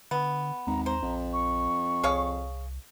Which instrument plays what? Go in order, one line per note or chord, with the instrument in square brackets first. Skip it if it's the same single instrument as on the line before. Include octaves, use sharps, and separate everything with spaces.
[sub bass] D3 [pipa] B3
[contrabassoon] G#1 [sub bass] D#2 [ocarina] A#5
[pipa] C5 [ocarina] A#5
[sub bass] A#1 [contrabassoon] F2
[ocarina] C#6
[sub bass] C2 [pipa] G#4 C#5 F5